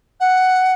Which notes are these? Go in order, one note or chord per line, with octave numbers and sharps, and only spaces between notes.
F#5